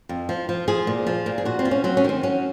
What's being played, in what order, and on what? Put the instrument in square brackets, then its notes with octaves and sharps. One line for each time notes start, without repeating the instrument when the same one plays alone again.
[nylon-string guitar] F2
F3
F3
F3 G#4
A#2
F3
A#2
G#4
A#2 F#4
C4
F3
C#4
F#3 C4
C#4
D#3 C4
F#3 C#4